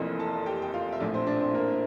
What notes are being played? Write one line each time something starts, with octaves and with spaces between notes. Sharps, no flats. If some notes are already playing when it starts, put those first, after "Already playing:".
Already playing: F1 F2 E3 A#3
A4 A5
G4 G5
G5
F4 F5
E5
A#1 A2 F3 A3 D4 D5
C4 C5
D4 D5
C4 C5
A#3 A#4